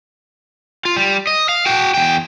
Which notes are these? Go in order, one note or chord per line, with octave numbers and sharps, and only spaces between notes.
F4
G3
D#5
F5
F#4 G5
E2 G5